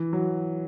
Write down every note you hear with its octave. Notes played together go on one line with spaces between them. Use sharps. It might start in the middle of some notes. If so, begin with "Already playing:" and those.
Already playing: E3
F#3